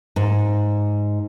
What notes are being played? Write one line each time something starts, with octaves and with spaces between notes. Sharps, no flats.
G#2